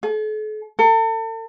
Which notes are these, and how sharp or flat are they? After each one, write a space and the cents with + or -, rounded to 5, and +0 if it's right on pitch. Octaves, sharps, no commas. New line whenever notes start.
A4 -45
A4 +40